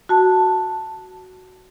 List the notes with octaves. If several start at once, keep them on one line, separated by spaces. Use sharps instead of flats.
F#4 A5